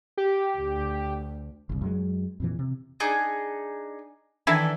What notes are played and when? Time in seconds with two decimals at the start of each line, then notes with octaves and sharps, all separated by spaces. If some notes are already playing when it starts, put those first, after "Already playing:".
0.17 G4
0.58 D2
1.69 F#1 C2
1.81 F#2 F#3 G#3
2.40 F2 A#2 E3
2.59 C3
3.00 D4 D#4 G#4
4.47 D#3 E3 D4 E4 A4 G#5